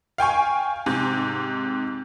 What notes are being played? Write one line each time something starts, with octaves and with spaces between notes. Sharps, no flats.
F5 G5 G#5 C#6
G#2 C3